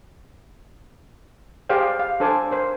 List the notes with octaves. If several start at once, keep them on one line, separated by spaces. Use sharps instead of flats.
G4 G#4 C5 D5 F5 G5
F5
D4 A4 C5 G#5 A5 D6
A#4 C5